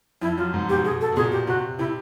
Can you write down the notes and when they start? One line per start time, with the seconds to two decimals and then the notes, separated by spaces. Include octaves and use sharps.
0.22 F2 E4
0.37 F#2 F4
0.54 G#2
0.68 B2 G4
0.84 B2 G#4
1.01 A4
1.12 B2
1.16 A#2 G#4
1.32 G4
1.47 C3 F#4
1.79 C3 E4